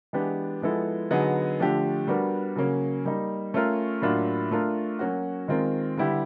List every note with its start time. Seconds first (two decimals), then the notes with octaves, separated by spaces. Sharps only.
0.13 E3 G#3 B3 D4 G4
0.62 F3 G#3 B3 E4 A4
1.10 D3 F#3 B3 D#4 G#4
1.59 D3 F3 A3 D4 G4
2.07 G3 B3 D4 F#4 A#4
2.56 C#3 F#3 A#3 C#4
3.05 G3 A#3 D#4
3.54 A3 C#4 F4 A#4
4.02 A2 F#3 A#3 D4 F4
4.51 A3 D4 F4 A#4
4.99 F#3 A#3 C#4 F#4
5.48 D#3 G#3 C4 F4 A#4
5.97 D3 G3 B3 E4 G4